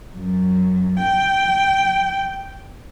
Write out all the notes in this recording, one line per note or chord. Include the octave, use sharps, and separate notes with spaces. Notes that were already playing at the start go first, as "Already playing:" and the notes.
F#2
G5